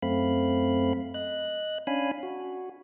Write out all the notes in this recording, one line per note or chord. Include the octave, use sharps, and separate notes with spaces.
F#2 A3 C4 F5 B5
D#5 F#6
C#4 D4 F5 G#5 B5
F#4